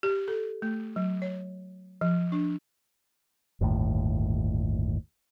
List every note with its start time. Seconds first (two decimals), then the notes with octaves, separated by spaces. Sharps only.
0.03 G4
0.28 A4
0.62 A3
0.96 F#3
1.22 C#5
2.01 F3
2.32 D4
3.61 G1 D#2 A2